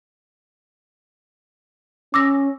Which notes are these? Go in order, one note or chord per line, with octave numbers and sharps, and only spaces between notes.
C#4 D6 E6 A#6